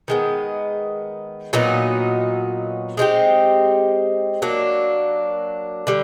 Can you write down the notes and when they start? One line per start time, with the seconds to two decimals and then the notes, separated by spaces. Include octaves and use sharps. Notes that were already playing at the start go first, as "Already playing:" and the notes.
0.08 D#3 G#3 B3
1.53 A#2 F#3 B3 D#4
2.97 G#3 C4 D#4 G4
4.42 F#3 A#3 D4
5.87 D3 G3